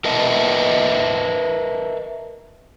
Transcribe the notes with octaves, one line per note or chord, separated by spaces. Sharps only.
A#4 B4 D#5 E5 A5